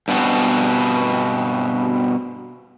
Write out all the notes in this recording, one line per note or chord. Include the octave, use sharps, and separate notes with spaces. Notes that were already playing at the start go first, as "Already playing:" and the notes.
G2 B2 B3 C4